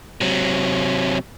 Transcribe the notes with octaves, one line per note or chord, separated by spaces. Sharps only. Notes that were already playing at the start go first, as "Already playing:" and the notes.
C3 F#3